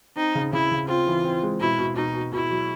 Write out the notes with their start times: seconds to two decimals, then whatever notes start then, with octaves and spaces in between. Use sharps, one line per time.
0.16 C4 D#4
0.35 C#3
0.53 C#3 E4
0.71 C#3
0.88 C4 F4
1.07 E3
1.24 C4
1.43 G#3
1.60 B2 E4
1.78 B2
1.96 B2 D#4
2.15 B2
2.32 B2 E4
2.50 F#3